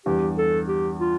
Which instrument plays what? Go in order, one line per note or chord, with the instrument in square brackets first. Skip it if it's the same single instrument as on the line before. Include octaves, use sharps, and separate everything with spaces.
[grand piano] E2 G2 [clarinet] G4
[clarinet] A4
G4
F4